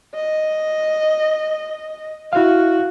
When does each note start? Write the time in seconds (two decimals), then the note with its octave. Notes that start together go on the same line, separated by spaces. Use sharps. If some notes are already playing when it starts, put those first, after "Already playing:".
0.16 D#5
2.33 E4 F#4 F5